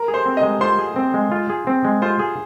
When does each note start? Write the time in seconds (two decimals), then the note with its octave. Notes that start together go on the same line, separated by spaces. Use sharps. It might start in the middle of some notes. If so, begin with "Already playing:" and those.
Already playing: A#4 A#5
0.08 G#4
0.14 C5 C6
0.26 C4
0.37 D#5 D#6
0.43 G#3
0.61 F4 C5 C6
0.79 G#4
0.96 C4
1.14 G#3
1.31 F4
1.50 G#4
1.67 C4
1.85 G#3
2.02 F4 C5 C6
2.19 G#4